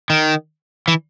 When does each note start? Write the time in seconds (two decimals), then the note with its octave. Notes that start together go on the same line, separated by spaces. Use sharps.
0.10 D#3
0.88 E3